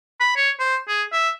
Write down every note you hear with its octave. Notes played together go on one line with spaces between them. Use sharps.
B5
C#5
C5
G#4
E5